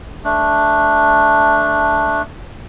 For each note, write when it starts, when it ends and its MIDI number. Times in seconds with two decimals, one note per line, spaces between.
0.24 2.22 57
0.24 2.22 62